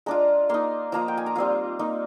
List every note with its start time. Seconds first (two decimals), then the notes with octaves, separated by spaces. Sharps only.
0.06 G#3 D4 F4 A#5
0.49 A#3 D#4 C6
0.92 F3 A#3 F4 A#5
1.08 G5
1.17 G#5
1.26 A#5
1.36 G3 C4 F4 C6
1.79 A#3 D#4